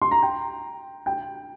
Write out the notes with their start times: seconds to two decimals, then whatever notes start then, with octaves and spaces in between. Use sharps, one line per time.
0.02 C6
0.11 A#5
0.22 G5
1.06 G5